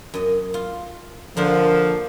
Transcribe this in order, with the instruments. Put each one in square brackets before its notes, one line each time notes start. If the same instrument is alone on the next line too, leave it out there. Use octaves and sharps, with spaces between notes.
[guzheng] F#2 D#5
F4
[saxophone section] D3 F3 [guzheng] A#3 D4 C5